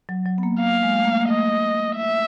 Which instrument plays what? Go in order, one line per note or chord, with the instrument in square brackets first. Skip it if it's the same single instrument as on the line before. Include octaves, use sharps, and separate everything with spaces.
[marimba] F#3
F#3
B3
A#3
[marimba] A#3 [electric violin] F5
[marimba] G#3
A3
A#3
A#3
[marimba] A3 [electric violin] D#5
[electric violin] E5